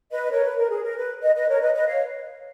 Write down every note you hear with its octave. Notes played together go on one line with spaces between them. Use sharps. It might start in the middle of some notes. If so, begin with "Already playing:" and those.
B4 D#5
A#4 C#5
B4
A#4
G#4
A#4
B4
B4 D#5
B4 D#5
A#4 C#5
B4 D#5
B4 D#5
C#5 F5